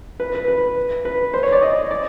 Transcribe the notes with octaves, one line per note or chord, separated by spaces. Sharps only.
B4
B4
B4
B4
C5
C#5
D5
D#5
D5